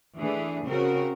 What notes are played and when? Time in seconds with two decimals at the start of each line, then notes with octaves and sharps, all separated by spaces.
0.17 E3 A3 D4 G#4
0.66 C#3 C4 F#4 A#4